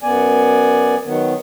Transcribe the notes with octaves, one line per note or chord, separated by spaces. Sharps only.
F#2 B3 D5 G#5
D#3 F#3 B3